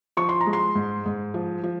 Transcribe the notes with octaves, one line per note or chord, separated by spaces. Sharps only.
F3 C#6
C6
A#5
G#3
C6
G#2
G#2
F3
F3